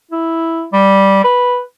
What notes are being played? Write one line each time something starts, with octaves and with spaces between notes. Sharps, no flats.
E4
G3
B4